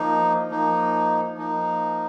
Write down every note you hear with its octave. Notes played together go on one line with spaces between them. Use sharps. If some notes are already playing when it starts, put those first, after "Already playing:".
Already playing: F3 A#3 D#4
F3 A#3 D#4
F3 A#3 D#4